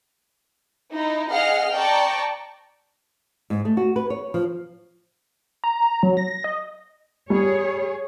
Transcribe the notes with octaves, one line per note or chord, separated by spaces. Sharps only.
D#4 E4
G#4 D#5 F5 F#5 F6
D5 G5 A5 A#5 C#6
G#2
A3
F#4
B4
C#5
F3
A#5
F#3
A#6
D#5
G3 G#4 C#5